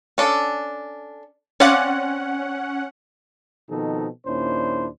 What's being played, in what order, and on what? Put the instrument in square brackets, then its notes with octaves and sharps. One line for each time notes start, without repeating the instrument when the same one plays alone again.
[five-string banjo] C#4 D4 A4
[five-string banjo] C4 D5 F5 [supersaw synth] C#4 F#5
[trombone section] B2 D#3 F3 C4 D#4 A4
D#2 A#2 C#4 D4 E4 C5